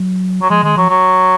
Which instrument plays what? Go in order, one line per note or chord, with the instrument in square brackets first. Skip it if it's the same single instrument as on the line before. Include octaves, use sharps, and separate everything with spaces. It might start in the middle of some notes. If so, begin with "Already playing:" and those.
Already playing: [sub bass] F#3
[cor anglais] F#3
[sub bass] F3 [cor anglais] G#3
[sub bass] D#3 [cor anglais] G#3
[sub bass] F3 [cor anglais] F#3
[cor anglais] F#3